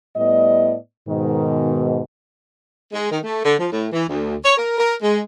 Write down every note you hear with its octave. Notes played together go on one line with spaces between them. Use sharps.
A2 G3 B3 D5 D#5
G#2 B2 D#3
G#3
D#3
A3
D3
F3
A2
E3
D2
C#5
A#4
A#4
G#3